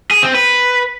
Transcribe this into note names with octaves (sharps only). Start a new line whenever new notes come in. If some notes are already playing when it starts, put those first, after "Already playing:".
G#4
C4
B4